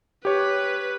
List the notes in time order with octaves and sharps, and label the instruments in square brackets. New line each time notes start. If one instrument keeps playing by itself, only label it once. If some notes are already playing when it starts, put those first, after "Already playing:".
[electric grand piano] G4 C#5 [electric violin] B4